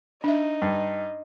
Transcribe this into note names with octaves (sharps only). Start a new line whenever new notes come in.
D4 D#4 E5
G2